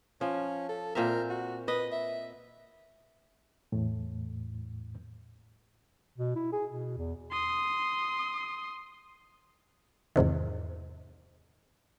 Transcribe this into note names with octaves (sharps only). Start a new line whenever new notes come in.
F3 C#4
A4
A#2 C4 A#4 E5
F#4
B4 D#5
E5
E2 A2
B2
E4
G#4
B2
E2
C6 D#6
E2 G#2 C3 D#3